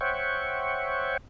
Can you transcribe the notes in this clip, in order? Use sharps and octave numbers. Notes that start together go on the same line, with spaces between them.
C5 C#5 E5 F#5 G5 C#6